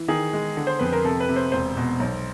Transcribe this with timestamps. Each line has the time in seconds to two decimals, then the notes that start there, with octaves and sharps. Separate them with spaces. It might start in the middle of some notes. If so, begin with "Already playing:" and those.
Already playing: E3
0.08 D#3 G#4
0.33 G#3
0.57 D3
0.67 C5
0.79 F2 B4
0.92 A#4
1.05 C3 A4
1.20 B4
1.29 C3
1.36 C5
1.52 E1 C5
1.77 B2
2.00 B1